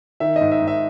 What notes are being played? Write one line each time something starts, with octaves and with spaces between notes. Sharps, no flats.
D#3 E5
D#5
G#2
E5
G#2
E5